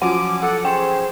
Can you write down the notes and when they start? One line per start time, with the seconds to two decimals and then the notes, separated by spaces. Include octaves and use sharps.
0.02 F3 F#3 C#4 F#5 D6
0.42 A4 F#5
0.65 C#4 G#4 C5 G5